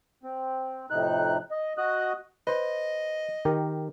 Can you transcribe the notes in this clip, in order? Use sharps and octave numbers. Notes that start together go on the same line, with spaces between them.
C4
F2 A2 C3 D#4 F#6
D#5
F#4 D#5 D#6 F#6
B4 C5 D#5
D#3 G4 A#4